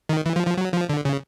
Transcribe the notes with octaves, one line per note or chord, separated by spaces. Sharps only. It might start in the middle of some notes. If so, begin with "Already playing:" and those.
D#3
E3
F3
F3
F#3
F3
D3
C#3